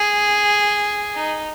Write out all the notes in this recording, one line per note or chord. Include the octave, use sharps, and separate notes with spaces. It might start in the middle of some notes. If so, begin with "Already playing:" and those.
Already playing: G#4
D#4